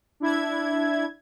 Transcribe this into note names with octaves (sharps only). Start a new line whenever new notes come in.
D4 E4 G#6